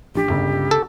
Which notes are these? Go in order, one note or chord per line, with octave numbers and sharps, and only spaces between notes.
A1 F3 D4 G4
G1 C#2 C#3
A4